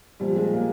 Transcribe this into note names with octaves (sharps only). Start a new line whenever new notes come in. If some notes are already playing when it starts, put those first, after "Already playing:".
A#2 F3 G3
G#3
A#3